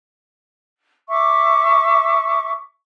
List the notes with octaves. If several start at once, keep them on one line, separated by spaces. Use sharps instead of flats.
E5 C#6 D6